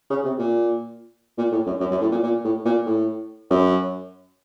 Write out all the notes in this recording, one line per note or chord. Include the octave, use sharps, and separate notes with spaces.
C#3
C3
A#2
A#2
A2
F#2
F#2
F#2
A2
A#2
A#2
A2
A#2
A2
F#2